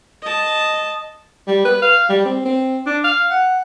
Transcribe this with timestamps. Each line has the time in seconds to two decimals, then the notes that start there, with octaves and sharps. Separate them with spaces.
0.22 D#5 A5
1.47 G3
1.65 B4
1.82 F5
2.09 G3
2.25 C4
2.45 C4
2.86 D4
3.04 F5
3.30 F#5